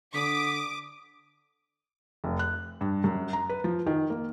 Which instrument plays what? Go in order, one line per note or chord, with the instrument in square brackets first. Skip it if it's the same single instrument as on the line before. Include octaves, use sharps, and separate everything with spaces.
[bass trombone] D3 [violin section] D6 [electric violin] D#6 [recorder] B6
[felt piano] F1
F#6
G2
F#2
A#5
B4
F3
D#3
A#3